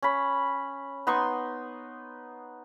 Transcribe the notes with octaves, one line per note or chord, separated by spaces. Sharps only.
C#4 B5
B3 D#4 C6 C#6